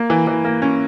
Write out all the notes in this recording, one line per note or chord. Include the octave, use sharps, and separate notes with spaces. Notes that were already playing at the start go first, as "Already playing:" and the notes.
Already playing: A#3
E3
E3
A#3
C#4